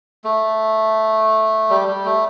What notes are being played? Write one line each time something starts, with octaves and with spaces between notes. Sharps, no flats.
A3
G3
G3
A3